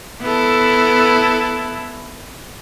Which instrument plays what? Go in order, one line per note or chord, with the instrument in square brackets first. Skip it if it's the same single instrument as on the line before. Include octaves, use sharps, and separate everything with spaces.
[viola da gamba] B3 E4 A4